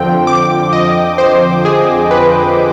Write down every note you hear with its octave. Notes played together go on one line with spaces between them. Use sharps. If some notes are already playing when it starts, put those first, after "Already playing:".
Already playing: F2 D3 F3 C4 G5
D6
D#5
C5
G#4
B4